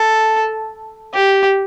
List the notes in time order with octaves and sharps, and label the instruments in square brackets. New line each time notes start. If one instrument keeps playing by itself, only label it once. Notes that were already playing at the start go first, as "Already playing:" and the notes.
Already playing: [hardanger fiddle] A4
G4